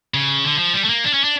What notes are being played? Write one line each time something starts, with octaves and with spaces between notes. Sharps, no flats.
C#3
D3
F3
G3
A3
A#3
D4
C#4
D4